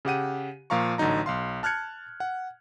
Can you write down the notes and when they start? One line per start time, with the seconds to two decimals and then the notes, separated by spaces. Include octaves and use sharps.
0.05 C#3 G4 F#5 D#7
0.70 A#2 F3 F5 A#5 C#6
0.98 A1 D3 F#3 D#4 A#5
1.26 B1 F5 C6
1.63 A5 F6 F#6 G#6 C#7
2.20 F#5